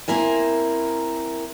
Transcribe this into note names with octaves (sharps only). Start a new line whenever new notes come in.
A#3 C4 E4 A#4 G#5